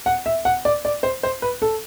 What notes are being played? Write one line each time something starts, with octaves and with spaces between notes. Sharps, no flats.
F#5
E5
F#5
D5
D5
C5
C5
B4
A4